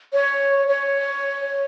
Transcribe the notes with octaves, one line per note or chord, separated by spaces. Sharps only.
C#5
C#5